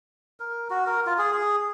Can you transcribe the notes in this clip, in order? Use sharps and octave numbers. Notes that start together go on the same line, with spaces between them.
A#4
F#4
A#4
F4
G#4
G#4